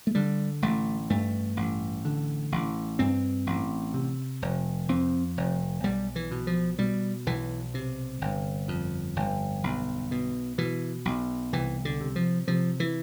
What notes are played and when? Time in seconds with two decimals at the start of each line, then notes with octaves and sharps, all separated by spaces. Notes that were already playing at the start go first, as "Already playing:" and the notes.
0.07 A3
0.15 D3 G3
0.62 A1 A3
1.10 G2 A3
1.57 A1
2.05 D3
2.52 A1
2.99 G2 C4
3.47 A1
3.94 C3
4.42 F1
4.89 F2 C4
5.37 F1
5.84 B1 G3
6.16 E3
6.31 B2
6.47 F3
6.79 B2 G3
7.26 B1 E3
7.74 C3
8.21 G1
8.68 F2
9.16 G1
9.64 B1
10.11 B2
10.58 B2 E3
11.05 B1
11.53 C2 E3
11.85 D3
12.01 C3
12.16 F3
12.48 C3 F3
12.80 E3